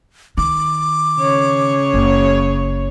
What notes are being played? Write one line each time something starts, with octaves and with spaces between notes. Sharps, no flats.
D#3 D6
C#3 C#5
F#1